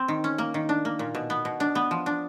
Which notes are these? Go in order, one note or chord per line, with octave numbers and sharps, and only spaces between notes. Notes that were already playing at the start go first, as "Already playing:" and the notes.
Already playing: C4
D#3
C#4
A#3
D#3
D4
A#3
A#2
B2
B3
B2
D4
B3
F3
D4